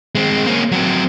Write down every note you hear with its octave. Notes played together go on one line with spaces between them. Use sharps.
G#3 C4
A#3 C#4
F#3 C4